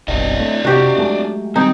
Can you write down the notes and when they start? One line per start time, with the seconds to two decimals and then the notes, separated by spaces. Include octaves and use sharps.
0.08 F#1 B1 G2 D4 D#5
0.39 A3
0.65 C3 F#4 G4
0.98 F#3 G#3 A3
1.56 D#3 G3 G#3 C4 D#4